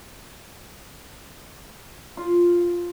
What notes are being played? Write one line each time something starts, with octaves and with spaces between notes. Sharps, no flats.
F4